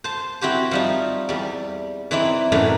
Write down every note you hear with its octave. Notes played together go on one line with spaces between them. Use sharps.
C5 A5
C4 E4 F#4 G4 C5
F3 G3 D#4
E2 G3
E3 C4 D#4 E4 D5
F#2 A2 E3 A3 D4 D#4